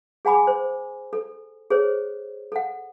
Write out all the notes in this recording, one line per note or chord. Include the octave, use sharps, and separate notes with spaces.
G#4 F#5 G#5 B5 D6
C5
A4
G#4 A4 C5 C#5
A4 F#5